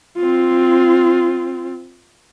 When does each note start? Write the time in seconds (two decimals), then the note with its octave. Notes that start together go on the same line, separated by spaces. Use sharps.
0.17 C4 F4